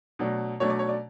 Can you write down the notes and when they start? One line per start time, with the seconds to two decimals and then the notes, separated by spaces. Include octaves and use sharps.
0.19 B2 F#3 A3 D4
0.60 B2 F#3 A3 D4 C#5
0.70 D5
0.79 C#5
0.89 D5